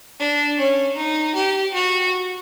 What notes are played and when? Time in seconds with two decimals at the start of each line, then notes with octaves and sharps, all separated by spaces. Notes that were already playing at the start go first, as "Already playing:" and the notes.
0.20 D4
0.59 C#4
0.96 D#4
1.35 G4
1.74 F#4